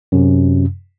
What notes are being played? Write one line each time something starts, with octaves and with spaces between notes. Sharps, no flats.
F#2 C3